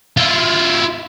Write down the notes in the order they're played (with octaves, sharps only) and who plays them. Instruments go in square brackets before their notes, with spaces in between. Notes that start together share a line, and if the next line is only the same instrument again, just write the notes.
[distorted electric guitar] E4 F4